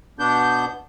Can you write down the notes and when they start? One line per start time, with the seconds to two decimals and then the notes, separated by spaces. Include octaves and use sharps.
0.19 B2 B3 D4 G6